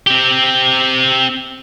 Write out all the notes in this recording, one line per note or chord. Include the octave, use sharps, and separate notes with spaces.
C4 G4